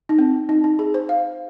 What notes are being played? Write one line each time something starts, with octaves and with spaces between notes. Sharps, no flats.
D#4
C4
D#4
D#4
G#4
C5
F5